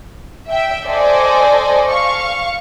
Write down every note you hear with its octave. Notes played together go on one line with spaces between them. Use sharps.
E5 G5
A4 C5 D5 D#5 G#5
F5 C#6